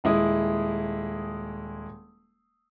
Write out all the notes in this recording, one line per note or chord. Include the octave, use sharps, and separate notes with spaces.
D#1 G#3 E4 D#6